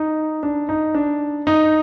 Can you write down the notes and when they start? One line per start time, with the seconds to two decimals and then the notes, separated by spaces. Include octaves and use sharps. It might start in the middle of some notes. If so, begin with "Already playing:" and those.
Already playing: D#4
0.43 D4
0.69 D#4
0.95 D4
1.47 D#4